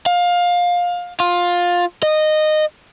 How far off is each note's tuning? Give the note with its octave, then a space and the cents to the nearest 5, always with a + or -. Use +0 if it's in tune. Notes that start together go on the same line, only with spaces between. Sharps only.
F5 +20
F4 +15
D#5 -15